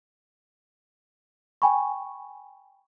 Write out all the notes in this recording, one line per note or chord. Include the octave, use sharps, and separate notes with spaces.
G5 G#5 B5 C#6